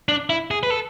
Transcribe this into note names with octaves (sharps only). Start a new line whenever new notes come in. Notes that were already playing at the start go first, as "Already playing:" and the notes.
D4
E4
G#4
B4
A4